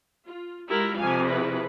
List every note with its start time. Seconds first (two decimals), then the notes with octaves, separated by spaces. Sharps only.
0.25 F4
0.68 G#3 E4 F4 G4 A#4
0.98 F2 C3 F5 G#5
1.27 E4 G#4 B4